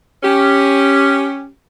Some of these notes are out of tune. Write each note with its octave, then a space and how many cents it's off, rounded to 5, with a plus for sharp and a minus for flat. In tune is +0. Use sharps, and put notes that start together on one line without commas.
C#4 +0 G4 +0